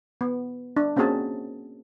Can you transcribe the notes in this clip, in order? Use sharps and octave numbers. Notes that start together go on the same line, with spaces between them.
B3
D4
A#3 C4 C#4 F#4 G#4 A5